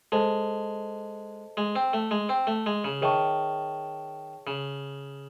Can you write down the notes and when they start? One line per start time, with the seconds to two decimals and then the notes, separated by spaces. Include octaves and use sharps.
0.12 G#3 A4 C5 D#5 A5
1.57 G#3
1.75 C4
1.93 A3
2.11 G#3
2.29 C4
2.47 A3
2.66 G#3
2.84 C#3
3.02 D#3 G#4 C#5 E5 A5 C#6
4.47 C#3